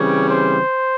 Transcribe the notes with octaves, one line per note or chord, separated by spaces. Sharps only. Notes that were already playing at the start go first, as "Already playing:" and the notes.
Already playing: C#3 E3 G3 C4 C#5
C5